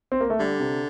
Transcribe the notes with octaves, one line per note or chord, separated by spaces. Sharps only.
C4
A#3
A3
D3 G3
C3